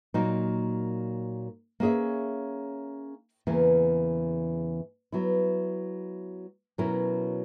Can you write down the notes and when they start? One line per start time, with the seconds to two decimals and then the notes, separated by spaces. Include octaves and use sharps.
0.14 A#2 F#3 A#3 D#4 A#4
1.80 A#3 C#4 G#4 C#5 E5
3.47 E2 C#3 E3 A#3
5.12 F#3 B3 E4
6.78 B2 F#3 C#4 E4 A#4